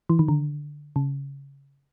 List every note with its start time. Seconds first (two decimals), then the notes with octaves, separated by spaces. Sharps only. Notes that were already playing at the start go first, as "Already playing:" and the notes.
0.09 E3
0.19 D#3
0.28 D3
0.96 C#3